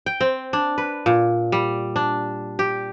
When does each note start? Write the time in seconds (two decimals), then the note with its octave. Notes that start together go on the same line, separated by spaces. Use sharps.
0.06 G5
0.21 C4
0.53 D4
0.78 B4
1.06 A#2
1.52 G3
1.96 D4
2.59 G4